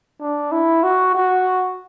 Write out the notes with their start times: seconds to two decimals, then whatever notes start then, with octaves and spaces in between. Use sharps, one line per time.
0.20 D4
0.52 E4
0.83 F#4
1.15 F#4